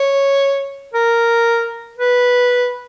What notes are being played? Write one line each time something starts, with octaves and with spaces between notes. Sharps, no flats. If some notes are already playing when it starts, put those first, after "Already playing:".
Already playing: C#5
A#4
B4